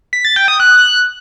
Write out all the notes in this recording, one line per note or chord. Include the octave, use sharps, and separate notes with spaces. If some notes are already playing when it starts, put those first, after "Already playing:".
B6
A6
G5
D#6
F#6